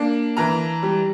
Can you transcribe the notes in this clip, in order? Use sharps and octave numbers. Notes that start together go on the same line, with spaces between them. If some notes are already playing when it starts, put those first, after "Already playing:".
Already playing: A#3 D4
E3 A#5
G3